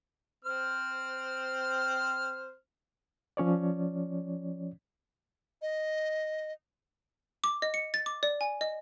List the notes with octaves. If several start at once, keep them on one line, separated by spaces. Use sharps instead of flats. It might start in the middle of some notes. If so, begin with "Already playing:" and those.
C4 C5 F6
F3 C#4 C#5 D5
D#5
D6
D#5
C#7
A6
D6
D5
G#5
D#5